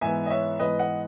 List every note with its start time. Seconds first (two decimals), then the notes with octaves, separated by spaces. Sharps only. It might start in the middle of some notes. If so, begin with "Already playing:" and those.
0.01 G#2 E3 B3 E5 G#5
0.26 D#5
0.30 C#5 E5
0.59 G#2 E3 B3 B4 D#5
0.79 D#5 F#5